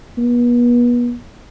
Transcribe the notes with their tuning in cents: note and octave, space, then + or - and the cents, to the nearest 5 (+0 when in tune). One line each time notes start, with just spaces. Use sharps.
B3 -35